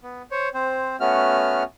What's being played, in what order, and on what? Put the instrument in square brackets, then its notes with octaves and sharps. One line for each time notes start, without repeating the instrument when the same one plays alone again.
[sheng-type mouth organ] B3
C5 C#5
C4 C5
A3 B3 C#4 F#4 F6